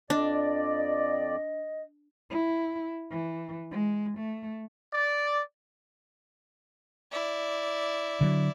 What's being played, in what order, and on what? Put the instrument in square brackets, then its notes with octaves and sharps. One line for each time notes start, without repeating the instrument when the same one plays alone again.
[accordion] F2 D5 [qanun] D4 [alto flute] D#5
[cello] E4
E3
G#3
A3
[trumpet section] D5
[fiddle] E4 D5
[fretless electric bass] D3 E3 F#3